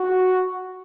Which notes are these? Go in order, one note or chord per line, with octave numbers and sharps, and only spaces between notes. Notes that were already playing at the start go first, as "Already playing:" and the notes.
Already playing: F#4